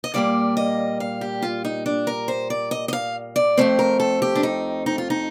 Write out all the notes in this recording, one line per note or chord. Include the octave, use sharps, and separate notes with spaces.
D#5
A#2 G3 A#3 D5
D#5
F5
G4
F4
D#4
D4
A#4
C5
D5
D#5
D#5
F5
D5
F2 D#3 A3 C4 C5
A#4
A4
G4
D4
D#4
D#4
F4
D#4